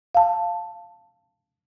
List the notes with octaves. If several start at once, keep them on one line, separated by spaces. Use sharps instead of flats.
F5 A5